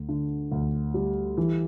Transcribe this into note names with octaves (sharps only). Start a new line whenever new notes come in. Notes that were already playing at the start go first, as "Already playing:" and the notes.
Already playing: D2
D3
D2
G3
E3